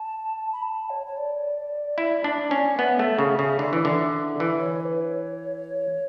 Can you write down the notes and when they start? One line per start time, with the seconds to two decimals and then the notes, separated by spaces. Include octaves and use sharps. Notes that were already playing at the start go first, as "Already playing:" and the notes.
Already playing: A5
0.53 B5
0.63 A5
0.90 C#5
1.07 C#5
1.17 D5
1.98 E4
2.24 D4
2.51 C#4
2.78 B3 E5
2.89 F#5
2.99 A3 E5
3.19 C#3
3.39 C#3
3.59 D3
3.73 E3
3.85 D3
4.40 E3
4.60 C#5
4.81 B4
5.01 C#5